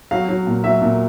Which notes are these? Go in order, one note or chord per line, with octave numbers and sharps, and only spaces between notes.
F#3 F5
F#3
A#2
F#3 E5
A#2